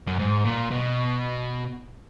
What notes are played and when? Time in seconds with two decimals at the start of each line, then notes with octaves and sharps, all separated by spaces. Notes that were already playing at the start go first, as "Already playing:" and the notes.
0.07 F#2
0.19 G#2
0.45 A#2
0.70 B2